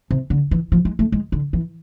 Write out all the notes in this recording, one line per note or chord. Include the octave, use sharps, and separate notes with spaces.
C3
D3
E3
F3
G#3
A3
G#3
D3
E3